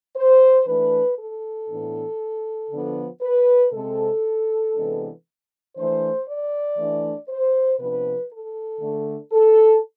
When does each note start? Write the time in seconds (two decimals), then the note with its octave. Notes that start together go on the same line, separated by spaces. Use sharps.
0.16 C5
0.67 E3 A3 D4 B4
1.19 A4
1.69 A2 E3 B3 D4
2.71 D3 F3 B3 D4
3.22 B4
3.72 C3 G#3 C4 A4
4.75 C3 E3 G#3 B3 D4
5.76 E3 A3 D4 C5
6.26 D5
6.77 E3 A3 D4
7.29 C5
7.79 C3 F3 B3 D4 B4
8.31 A4
8.81 D3 A3 D4
9.32 A4